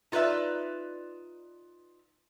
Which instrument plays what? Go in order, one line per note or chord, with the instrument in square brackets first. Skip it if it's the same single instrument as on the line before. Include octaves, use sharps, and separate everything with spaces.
[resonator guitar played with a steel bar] D#4 F4 B4 D5 E5